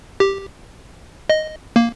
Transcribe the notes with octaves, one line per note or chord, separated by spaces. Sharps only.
G4
D#5
A#3